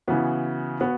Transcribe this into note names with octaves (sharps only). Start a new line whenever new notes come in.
C#3 E3 B3 F#4
B3 F#4